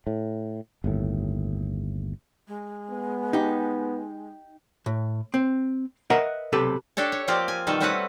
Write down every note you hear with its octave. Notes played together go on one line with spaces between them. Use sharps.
A2
G1 D#2 A2
G#3
B3
D#4 G4
A2
C4
A#4 B4 D#5 E5 F#5 A#5
B1 C3 G4 A4 B4
D4 G4 A4 C#5
C#5
F3 A#3 C4 F4 G4 D5
G#5
B2 D#3 G3 A4
G3 A3 C4 C#4 B4 F#5